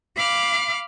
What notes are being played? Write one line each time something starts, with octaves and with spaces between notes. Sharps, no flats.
F5 B5 D6 F6